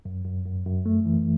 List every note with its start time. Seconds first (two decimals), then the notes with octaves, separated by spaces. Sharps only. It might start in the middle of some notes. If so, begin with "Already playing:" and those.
0.05 F#2
0.25 F#2
0.45 F#2
0.66 F#2
0.86 A3
1.06 E3